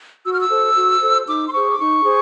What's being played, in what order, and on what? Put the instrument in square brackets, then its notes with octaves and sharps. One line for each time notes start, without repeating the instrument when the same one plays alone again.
[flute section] F#4 E6
F6
E6
A4 C5
F#4
A4 C5
D#4 D6
C6
G#4 C5 C#6
D6
D#4 C#6
G#4 C5